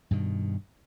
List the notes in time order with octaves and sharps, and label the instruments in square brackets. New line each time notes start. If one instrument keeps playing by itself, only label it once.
[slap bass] G2 B2 D#3